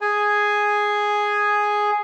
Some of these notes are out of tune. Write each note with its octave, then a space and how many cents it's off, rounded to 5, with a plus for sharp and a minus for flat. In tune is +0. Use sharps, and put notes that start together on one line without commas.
G#4 +0 G#5 +0